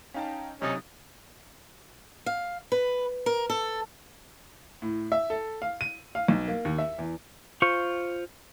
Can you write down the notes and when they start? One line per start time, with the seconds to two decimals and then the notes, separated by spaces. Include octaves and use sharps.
0.14 C#4 D#4 F5 G5 A5
0.62 B1 C3 C#4 D#4 D#6 A6
2.26 F5
2.72 B4
3.26 A#4
3.50 A4
4.82 A2
5.12 E5
5.30 A4
5.62 F5
5.81 D#7
6.15 F5
6.28 B1
6.48 A#3
6.65 D#2
6.78 E5
6.99 E2
7.62 F4 C5 C#6